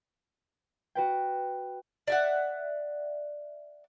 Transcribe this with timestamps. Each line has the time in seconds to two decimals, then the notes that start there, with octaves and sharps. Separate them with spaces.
0.95 F#4 B4 G5
2.07 D5 E5 F#5